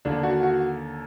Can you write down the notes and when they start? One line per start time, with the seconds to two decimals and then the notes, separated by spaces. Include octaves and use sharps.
0.05 D#2 D3 D4
0.23 F#4
0.43 F#4